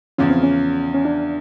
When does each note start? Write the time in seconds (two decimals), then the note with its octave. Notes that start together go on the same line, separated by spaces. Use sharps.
0.18 E2 C#3 F3 C#4
0.30 C4
0.43 C#4
0.94 C#4
1.05 D4